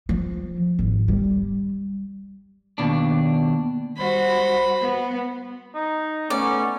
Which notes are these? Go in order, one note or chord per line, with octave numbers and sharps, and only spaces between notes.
F3
G#1
G3
D#2 B2 D4
G3 F#4 C5 B5
B3
D#4
A3 B3 C#4 C#5 D5